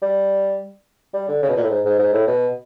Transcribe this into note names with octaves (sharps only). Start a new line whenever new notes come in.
G3
G3
D3
C#3
B2
A#2
A2
G#2
G#2
G#2
A2
B2